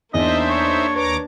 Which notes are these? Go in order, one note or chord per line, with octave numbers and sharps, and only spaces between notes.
E2 A#3 D4 D#4 C5 D#5 E5
C#5
D#2 B4 C#5 A#5 D6